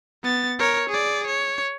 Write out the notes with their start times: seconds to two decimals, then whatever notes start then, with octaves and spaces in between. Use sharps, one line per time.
0.24 B3 A6
0.59 A#4 C#5
0.89 G#4 D5
1.27 C#5